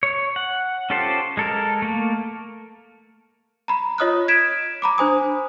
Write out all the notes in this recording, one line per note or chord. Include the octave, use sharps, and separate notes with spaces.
C#5
F#5
C#4 F4 G4 A4 C5
G#3 A4 A#4
A3 A#3
A#5 B5
F4 C#5 D#5 D#6 F6 F#6
G#6 B6 D7 E7
A#5 B5 D6
D4 C5 G#5 D#6